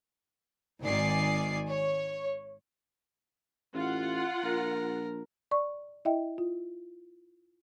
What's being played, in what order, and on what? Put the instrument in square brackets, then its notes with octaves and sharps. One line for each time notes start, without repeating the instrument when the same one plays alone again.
[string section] G#1 D#3 D5 G#5 C7
C#5
[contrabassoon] A1 [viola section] F4 F#5
[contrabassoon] A#1 [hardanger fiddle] A#4
[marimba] D5 C#6
E4 D#5 E5 G5
F4